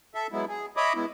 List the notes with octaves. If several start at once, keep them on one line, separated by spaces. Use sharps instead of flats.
A4 E5
F#3 G#3 B3 E4
G#4
C#5 D#5 E5 B5 D6 D#6
G#3 B3 E4